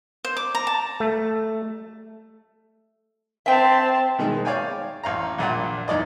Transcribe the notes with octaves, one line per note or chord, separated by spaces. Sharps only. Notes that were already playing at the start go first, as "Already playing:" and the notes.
C5
D6
A#5
A5
A3
C4 E5 G5 A5
B2 D#3 G#3
C#5 D5 F5 G5 G#5
A1 F5 A#5
A#1 A#2 D5 F#5
E2 D#4 D5 D#5